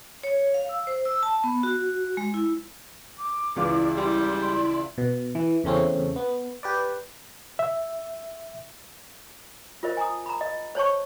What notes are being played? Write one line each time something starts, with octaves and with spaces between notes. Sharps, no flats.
C#5
F5
E6
C5
E6
A5
B3
F#4
G#3
E4
D6
C#2 E3 E4 F4 D5
G3 C6
B2
E3
E2 C#3 A3 C4 C#4
B3
G4 B4 D5
E5
F4 A#4 C5 D#5
G#5 A#5 D#6
A#5 B5
D#5
C5 C#5 A5 C#6